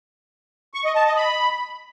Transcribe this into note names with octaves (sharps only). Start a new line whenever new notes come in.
C#6
D#5
A5
D#5
B5